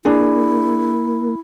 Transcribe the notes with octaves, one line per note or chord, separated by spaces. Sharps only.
A#3 D4 E4 G#4